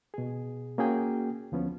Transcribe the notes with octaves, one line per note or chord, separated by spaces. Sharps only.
B2 G#4
A#3 C#4 F#4 G#4 G5 G#5
D2 F3 B3 C#4